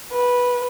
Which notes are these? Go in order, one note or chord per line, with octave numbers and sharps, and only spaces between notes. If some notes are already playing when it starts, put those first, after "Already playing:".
B4